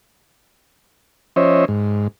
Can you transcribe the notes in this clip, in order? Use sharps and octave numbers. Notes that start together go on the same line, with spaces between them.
F3 C#4 C5 C#5 D#5 E5
G#2